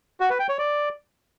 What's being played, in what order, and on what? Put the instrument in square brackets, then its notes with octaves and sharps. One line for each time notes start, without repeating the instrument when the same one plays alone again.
[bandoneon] F#4
B4
G5
C#5
D5